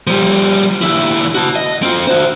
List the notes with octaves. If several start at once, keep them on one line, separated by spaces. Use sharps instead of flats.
F3 G3
D#2 E4
F#4 A5
D#5
C4 F4
F#4 C5